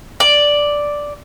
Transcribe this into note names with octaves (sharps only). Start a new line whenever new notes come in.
D5